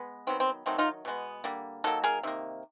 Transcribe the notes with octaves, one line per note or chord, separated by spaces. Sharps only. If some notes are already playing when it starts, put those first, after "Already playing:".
Already playing: G#3 B3
D#3 F#3 B3 C4
C4
D#3 F#3 A3 C4
D#4 F4
B2 G#3 B3
D3 G3 A#3
D#3 F#3 A#3 A4
G#4 A#4
C3 D#3 A#3